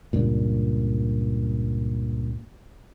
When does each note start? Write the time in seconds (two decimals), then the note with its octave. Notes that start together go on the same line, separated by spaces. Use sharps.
0.13 C#2 G2 A#2